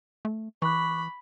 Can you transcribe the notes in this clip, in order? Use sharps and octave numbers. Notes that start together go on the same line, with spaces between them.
A3
E3 B5 C#6 D6 F#6